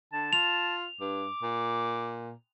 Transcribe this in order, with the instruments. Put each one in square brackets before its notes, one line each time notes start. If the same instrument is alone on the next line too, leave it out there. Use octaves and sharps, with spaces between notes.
[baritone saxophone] D3 [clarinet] A5
[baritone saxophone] F4 [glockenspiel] F7
[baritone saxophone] G2 [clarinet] D6
[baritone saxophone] A#2